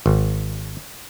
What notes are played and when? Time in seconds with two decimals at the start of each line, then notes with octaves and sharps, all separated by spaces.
0.06 G#1